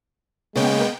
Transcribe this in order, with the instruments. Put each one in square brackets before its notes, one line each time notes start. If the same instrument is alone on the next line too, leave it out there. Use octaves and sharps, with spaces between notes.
[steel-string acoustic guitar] C#3 [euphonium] G#3 [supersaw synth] A#3 B3 G5